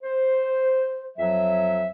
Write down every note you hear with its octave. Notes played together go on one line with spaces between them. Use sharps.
C5
F2 F#3 E5